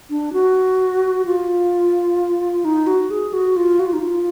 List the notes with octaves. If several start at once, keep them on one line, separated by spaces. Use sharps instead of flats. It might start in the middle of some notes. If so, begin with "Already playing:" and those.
D4
F#4
F4
D#4
F#4
G#4
F#4
F4
F#4
F4
D#4
F4